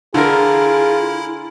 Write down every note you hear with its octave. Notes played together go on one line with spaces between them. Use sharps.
D3 E4 F4 G#4 A#4